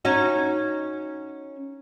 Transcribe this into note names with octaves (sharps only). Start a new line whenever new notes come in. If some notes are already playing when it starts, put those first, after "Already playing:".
C#4 D#4 F#4